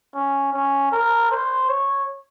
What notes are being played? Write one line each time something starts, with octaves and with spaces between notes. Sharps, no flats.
C#4
C#4
A#4
C5
C#5